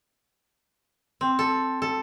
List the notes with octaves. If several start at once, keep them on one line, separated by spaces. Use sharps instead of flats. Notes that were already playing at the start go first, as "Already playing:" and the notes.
C4
A4
A4